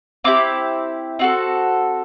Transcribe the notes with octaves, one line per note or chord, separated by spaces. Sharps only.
C4 E4 G4 D6
C4 F#4 A4